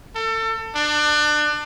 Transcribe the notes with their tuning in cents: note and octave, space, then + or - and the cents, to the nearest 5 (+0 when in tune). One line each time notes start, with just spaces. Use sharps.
A4 +30
D4 +30